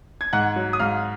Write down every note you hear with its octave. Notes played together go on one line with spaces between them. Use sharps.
G#6
G#2 F#5 F#6
F#3
D#6
G#2 F5 F6